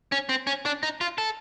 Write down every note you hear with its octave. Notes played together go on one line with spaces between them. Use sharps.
C#4
C4
C#4
D4
D#4
F4
A4